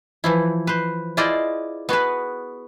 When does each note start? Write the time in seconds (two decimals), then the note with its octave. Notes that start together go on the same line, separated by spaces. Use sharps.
0.24 E3 F3 E4
0.67 B4 C5
1.17 E4 F4 G#4 C5 D5 D#5
1.89 B3 F#4 G#4 B4